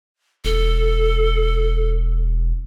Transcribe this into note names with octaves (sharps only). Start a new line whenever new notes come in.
E1 A4